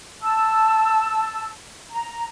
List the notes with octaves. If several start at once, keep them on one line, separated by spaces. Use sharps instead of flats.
A5 E6
A#5